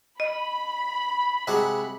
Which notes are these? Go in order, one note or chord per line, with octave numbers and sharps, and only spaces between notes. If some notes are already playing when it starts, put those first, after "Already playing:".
D#5 B5
C3 G#3 F#4